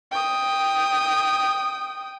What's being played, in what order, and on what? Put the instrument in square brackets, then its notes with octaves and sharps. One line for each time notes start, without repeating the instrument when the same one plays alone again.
[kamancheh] G5 D#6